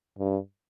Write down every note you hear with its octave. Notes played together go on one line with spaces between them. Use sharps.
G2